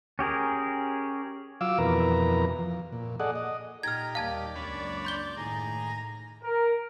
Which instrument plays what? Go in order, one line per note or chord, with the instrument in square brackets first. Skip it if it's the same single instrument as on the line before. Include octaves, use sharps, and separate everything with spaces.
[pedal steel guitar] C#4 G4 G#4 A#4
[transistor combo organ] F#3 F4 F5 D6 E6
F2 B2 E3 A#4 B4 A#5
F3
A#2
G#4 A4 D5 D#5 F#5
D#5
[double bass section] A#2 [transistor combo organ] D#4 G4 [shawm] A#5 [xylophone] F6 G#6
[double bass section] D#2 G3 A#3 [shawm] D5 [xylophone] F5 A5 G#6
[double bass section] C#2 F#2 A#3 [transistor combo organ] D4 C#5 B5
[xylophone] C6 G6 G7
[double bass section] A2 [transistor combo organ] D#3 G#4 [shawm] A#5
[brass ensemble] A#4